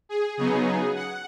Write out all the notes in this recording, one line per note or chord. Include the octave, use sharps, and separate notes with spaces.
G#4
C#3 F#3 B3 D#4 G#4
F#5